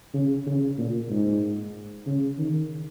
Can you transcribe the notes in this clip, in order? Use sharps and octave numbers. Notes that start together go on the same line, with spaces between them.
C#3
C#3
A#2
G#2
C#3
D#3